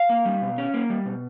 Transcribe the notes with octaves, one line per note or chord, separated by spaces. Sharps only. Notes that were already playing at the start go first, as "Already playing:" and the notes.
Already playing: F5
A#3
G3
B2
C#4
A#3
G3
B2